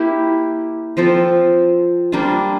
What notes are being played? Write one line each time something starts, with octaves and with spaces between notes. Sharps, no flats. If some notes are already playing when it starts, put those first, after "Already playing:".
Already playing: A#3 E4 G4
F3 C4 F4 A4
G3 A#3 D4 F4